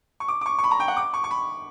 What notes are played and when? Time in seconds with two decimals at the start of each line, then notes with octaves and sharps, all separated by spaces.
0.20 C#6
0.28 D6
0.41 D6
0.46 C#6
0.59 C#6
0.64 B5
0.71 A#5
0.80 G5
0.88 F#5
0.97 D6
1.14 C#6
1.24 C#6
1.31 B5